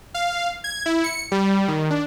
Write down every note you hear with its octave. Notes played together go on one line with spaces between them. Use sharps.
F5
G#6
E4
C#7
G3
D#3
D4